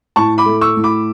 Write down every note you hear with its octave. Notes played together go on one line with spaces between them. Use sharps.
A2 A5 C#6
B5 D6
A3
C#6 E6
A2
B5 D6